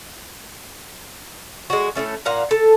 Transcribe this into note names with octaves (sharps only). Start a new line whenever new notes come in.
G#3 F#4
A2 D3 A3 C#4
A#2 F5 F#5 A#5
A4